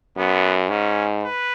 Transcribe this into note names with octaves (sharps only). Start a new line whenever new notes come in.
F#2 B3
G#2 C#4
B4